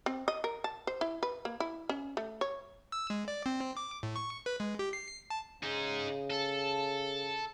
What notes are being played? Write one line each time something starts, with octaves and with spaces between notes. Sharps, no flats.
C4
D#5
A#4
A5
C5
E4
B4
A#3
E4
C#4
A3
C#5
E6
G#3
D5
C4
D6
A2
C#6
B4
G#3
G4
C7
A5
C#3 D#4 G#4
A4